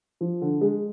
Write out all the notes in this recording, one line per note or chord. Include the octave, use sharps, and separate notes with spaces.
F3
D3
G#3